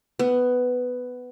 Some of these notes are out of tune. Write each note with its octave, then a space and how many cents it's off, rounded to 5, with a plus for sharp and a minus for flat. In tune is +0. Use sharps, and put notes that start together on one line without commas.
B3 +10